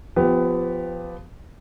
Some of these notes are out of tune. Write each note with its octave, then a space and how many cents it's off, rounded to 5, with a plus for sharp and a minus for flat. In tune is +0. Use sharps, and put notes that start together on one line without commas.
F3 +0 B3 +20 G4 +5